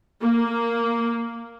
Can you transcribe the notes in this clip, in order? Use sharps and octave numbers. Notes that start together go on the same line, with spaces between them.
A#3